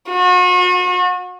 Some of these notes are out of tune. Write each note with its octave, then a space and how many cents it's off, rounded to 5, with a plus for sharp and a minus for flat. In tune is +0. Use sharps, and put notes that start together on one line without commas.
F#4 -40